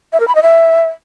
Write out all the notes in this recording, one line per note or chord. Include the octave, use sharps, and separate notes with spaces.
E5
A#4
B5
D#5
E5